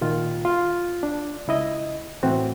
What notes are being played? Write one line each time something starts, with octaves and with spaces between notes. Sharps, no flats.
A#2 D#3 F4
F4
D4
C#2 E4 D#5
A2 E3 C4 F#4